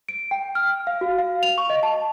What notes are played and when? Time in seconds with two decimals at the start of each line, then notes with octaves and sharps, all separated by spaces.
0.09 D7
0.31 G5
0.55 F6
0.87 F5
1.01 F#4
1.18 F5
1.43 F7
1.58 C#6
1.70 D#5
1.83 A5
1.94 A5